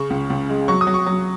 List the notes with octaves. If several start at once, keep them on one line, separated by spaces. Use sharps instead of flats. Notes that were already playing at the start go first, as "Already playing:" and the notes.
Already playing: C#3 C#6
C#2
C#2
G#3
F#3 C#6
D#6
F#3
C#6
F#3